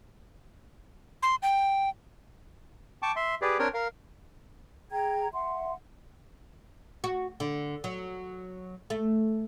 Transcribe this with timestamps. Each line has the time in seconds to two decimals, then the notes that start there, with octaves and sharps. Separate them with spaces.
1.22 C6
1.42 G5
3.02 G5 A5 C#6 D6
3.16 E5 C6
3.42 G4 G#4 B4 D5
3.59 C4 D4 A#4 C#5 G5
3.74 A#4 F5
4.91 G#4 G5 A#5 G#6
5.33 E5 F#5 C6
7.04 F#4
7.40 D3
7.84 F#3
8.90 A3